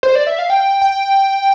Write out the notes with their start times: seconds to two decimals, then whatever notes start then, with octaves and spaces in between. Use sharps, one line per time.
0.03 C5
0.15 D5
0.27 E5
0.39 F5
0.50 G5
0.81 G5